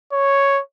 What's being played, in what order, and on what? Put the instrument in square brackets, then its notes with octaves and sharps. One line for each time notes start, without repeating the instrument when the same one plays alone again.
[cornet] C#5